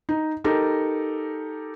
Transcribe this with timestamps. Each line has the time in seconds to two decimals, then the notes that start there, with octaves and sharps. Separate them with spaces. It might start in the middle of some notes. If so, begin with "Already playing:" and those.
0.09 D#4
0.44 D#4 G4 A4 A#4